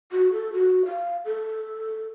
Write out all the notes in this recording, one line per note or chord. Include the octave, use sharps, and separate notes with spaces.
F#4
A4
F#4
F5
A4